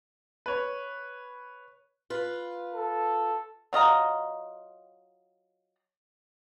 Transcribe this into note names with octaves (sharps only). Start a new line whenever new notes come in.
B4 C#5
F4 B4
A4
F#3 F4 D#5 A#5